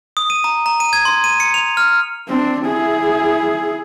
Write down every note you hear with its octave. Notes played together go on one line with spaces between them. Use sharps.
D#6
D#7
A#5
A#5
D#7
G#6
C6
D#7
C#7
F7
F6
C4 D4
E4 G#4